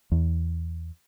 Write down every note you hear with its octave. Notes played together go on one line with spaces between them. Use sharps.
E2